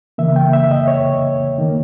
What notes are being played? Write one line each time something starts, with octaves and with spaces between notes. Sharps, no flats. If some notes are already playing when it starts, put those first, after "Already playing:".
C#3 E3 A#3 E5
G5
E5
D#5
C#5
D#3 A#3